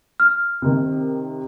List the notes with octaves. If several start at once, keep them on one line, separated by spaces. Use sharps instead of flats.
F6
C3 D#3